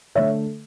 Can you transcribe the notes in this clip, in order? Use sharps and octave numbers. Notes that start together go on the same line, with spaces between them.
D3 A3 C#5 E5